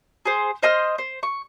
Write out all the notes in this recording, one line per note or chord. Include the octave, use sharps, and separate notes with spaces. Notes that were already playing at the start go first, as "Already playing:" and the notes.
G#4 C5
C5 D#5 C6 F6
C5
C#6